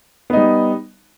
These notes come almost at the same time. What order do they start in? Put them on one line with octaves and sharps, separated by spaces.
B3 D#4 G3